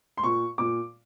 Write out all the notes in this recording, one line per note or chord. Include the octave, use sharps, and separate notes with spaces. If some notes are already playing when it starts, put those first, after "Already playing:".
C6
A#2 C#6
A#2 D6